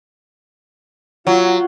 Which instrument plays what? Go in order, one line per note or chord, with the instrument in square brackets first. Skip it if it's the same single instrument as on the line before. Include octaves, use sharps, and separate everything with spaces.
[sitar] F#3 [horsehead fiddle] F4